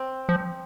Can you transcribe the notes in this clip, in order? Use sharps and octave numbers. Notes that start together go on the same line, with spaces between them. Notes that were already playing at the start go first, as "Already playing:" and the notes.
Already playing: C4
F3